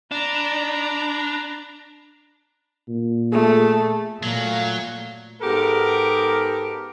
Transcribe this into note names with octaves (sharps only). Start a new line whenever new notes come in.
D4 A#5 B5
A#2
A3 G#4
A#2 F#3 A3 F5
G#2 B3 G4 A4 A#4